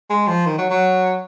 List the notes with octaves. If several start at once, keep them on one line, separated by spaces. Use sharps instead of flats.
G#3
F3
D#3
F#3
F#3